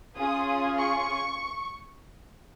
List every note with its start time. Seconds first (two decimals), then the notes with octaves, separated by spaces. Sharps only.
0.17 C#4 F4 G#4 D#6
0.79 C#6